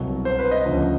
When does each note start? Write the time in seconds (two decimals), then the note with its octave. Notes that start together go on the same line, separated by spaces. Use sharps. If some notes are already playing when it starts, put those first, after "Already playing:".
Already playing: C2 B2 F#3
0.25 C5
0.39 B4
0.51 D#5
0.65 D2 C#3 F3